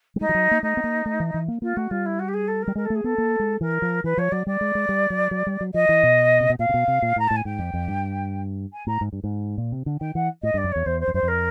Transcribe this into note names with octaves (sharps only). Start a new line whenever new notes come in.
G3
G#3 D#4
F3
F#3
A#3
A3 D#4
B3
A#3
A3
E3
E3
A#3
A#3 F4
A3 F#4
G3 F4
E4
F#4
G4
G#4
A4
A#4
G3
G#3 A#4
A4
A3
G#4
B3 A4
A#3
G#3
E3 A#4
F3
E3 B4
F3 C#5
F#3 D5
G3 D5
G#3
G#3
G3
F#3
F#3
G3
F#3
F3 D#5
E3
B2
C3
B2
A#2 F5
C3
B2
C3
A#2
A2 A#5
A2 A5
G#5
G#2 G5
F2
F2
G2
G#5
A2 A#5
G#2
G2
G#2
A#2
C3
D3
D#3 G5
E3 F#5
A2 D#5
G2 D5
F#2
E2 C#5
E2 C5
C5
F2
F#2 C5
F2
A#4